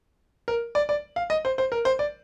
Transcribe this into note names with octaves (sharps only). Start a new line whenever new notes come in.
A#4
D5
D5
F5
D#5
C5
C5
A#4
C5
D5